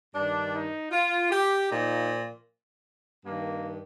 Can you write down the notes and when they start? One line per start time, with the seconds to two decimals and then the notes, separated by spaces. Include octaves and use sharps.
0.14 G2 D#3 D4
0.54 D#4
0.92 F4
1.31 G4
1.69 A#2 F3 D#4
3.25 G2 D#3 A#3